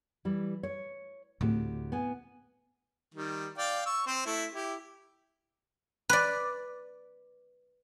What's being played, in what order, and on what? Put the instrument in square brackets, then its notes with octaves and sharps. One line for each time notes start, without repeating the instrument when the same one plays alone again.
[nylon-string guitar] E3 G3
C#5
[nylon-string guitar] D2 G4 [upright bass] A2 C4
[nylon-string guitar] B3 G#5
[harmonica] D#3 G3
D5 F5 G5
C#6 E6
C4 C5
A3 E4
E4 G4
[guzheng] B4 D5